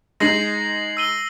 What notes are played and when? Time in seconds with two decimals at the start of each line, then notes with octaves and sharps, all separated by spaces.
0.20 G#3 D#4 A#6 C7 F#7
0.97 E6 D#7 G7